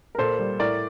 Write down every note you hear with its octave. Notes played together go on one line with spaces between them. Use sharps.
A#4
A#2 A4 C5
G3
A2 A#4 D5